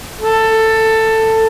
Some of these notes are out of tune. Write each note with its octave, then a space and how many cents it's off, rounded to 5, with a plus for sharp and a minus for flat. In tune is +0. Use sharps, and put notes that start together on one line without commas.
A4 +10